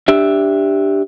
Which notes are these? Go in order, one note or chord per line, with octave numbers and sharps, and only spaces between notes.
D4 G4 E5